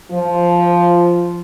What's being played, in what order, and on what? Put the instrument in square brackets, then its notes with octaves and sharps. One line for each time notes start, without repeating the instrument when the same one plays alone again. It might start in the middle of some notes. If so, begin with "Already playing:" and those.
[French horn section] F3